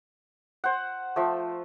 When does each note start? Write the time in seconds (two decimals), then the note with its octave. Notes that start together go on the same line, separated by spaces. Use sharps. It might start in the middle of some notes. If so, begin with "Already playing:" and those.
0.64 C5 F#5
1.16 F3 A3